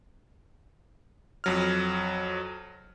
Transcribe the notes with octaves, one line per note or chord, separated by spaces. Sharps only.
F2 F#3 F6